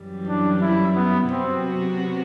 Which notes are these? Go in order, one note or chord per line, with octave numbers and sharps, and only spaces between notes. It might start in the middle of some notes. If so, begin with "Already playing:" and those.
Already playing: F#2 E3 G3
D4
E4
B3
C3 F#3 B3 C4 F#4